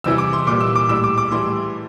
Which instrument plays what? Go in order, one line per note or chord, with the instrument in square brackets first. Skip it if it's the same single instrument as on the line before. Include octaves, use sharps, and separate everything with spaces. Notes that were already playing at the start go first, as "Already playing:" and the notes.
[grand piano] E2 C3 E3 G3 E6
D6
C6
A#2 G3 D6
E6
D6
A2 G3 E6
D6
D6
A2 E3 G3 C6